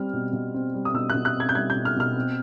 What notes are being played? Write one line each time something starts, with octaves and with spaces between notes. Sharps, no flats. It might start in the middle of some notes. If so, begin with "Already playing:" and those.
Already playing: G3 C4 F6
B2
B2
C4
G3
D#6
B2 E6
B2 F#6
F#6
C4 G#6
G6
G3 G#6
G6
B2
F6
B2 F6
C4